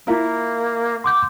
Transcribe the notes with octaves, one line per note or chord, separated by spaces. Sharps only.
A#3 E4 F4 A#4
F#5 C6 D6 G6